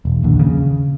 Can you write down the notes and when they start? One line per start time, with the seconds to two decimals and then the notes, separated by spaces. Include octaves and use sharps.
0.05 E1
0.24 A#1 D#2 D3
0.39 C#3